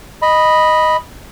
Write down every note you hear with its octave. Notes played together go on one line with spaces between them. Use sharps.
D#5 B5